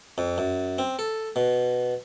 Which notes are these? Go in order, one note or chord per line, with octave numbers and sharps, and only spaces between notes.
F2
F#2
C4
A4
B2